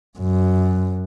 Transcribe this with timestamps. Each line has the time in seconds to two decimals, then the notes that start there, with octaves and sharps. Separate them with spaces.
0.19 F#2